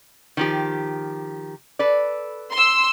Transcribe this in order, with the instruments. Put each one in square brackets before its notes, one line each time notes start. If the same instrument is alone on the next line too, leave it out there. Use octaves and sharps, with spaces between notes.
[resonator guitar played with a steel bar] D#3 F3 G4
A4 B4 D5
[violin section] C6 E6